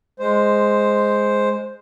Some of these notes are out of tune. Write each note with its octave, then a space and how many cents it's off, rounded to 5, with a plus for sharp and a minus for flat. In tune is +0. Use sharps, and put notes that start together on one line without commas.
G#3 +0 C5 +0